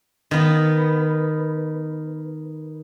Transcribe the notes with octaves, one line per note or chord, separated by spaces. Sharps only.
D#3 B3